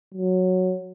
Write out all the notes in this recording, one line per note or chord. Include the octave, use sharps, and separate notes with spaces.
F#3